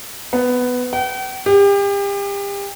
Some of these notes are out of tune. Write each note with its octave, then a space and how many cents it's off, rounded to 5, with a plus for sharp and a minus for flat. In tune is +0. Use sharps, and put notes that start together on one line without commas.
B3 +10
G5 -45
G4 +35